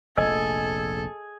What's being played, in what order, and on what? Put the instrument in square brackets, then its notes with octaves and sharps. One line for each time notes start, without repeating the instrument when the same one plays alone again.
[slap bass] F1 A#1 [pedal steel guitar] G#4 G#5 E6 [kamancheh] A4 [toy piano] D#5